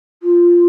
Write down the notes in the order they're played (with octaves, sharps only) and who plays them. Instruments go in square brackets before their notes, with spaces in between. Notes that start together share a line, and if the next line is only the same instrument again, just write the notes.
[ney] F4